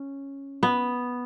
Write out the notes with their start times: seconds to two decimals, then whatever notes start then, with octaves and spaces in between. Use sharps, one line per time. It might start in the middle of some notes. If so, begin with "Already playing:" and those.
Already playing: C#4
0.63 B3